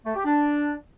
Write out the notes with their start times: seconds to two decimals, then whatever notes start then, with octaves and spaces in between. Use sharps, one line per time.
0.05 A3
0.15 G4
0.25 D4